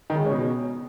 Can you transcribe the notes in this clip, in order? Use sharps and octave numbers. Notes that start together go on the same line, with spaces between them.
D#3
C#3
G#3
C#4
B2